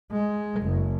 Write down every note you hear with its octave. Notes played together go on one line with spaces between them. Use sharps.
G#3
F#1